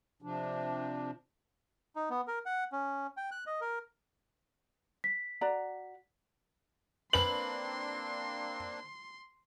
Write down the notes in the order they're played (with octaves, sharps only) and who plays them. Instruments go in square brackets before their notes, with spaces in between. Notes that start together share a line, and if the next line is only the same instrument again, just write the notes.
[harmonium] C3 F3 D4
[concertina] D#4
B3
A#4
F#5
C#4
G5
F#6
D#5
A#4
[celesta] B6
[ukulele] F#4 D5 A#5
[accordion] A#3 C4 D4 [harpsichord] B4 C5 [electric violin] C6 [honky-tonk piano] F#7